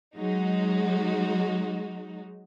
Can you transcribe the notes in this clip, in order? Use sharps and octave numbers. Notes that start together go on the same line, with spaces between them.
F#3 G#3 D#4 F#4